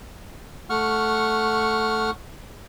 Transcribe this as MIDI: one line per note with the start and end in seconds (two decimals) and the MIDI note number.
0.70 2.10 57
0.70 2.10 78
0.70 2.10 85
0.70 2.10 89